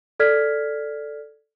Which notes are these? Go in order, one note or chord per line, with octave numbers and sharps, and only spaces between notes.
A4 D5 F6 G#6 B6